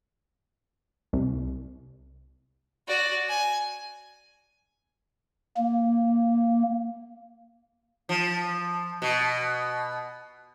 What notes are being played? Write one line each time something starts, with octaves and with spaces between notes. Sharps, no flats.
C2
F#4 D5
G#5
A#3
F3
B2